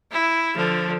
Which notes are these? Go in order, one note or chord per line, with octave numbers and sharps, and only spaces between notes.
E4
D3 F3